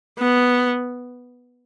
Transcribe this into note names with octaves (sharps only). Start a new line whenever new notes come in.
B3